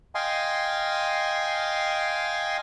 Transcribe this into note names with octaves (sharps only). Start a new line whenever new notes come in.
D#5 F5 G5 G#5 C6